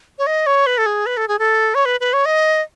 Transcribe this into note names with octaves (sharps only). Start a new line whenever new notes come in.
C#5
D#5
C#5
B4
A4
G#4
B4
A4
G#4
A4
C#5
B4
B4
C#5
D#5